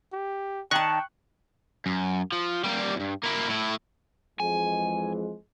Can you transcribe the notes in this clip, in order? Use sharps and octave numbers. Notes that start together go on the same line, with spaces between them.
G4
D#3 G5 A5 C#6 F#6
F#2
F3
G3 A#3
E2 G2
A#3 E4
A2 E4
F2 E3 G#3 G#5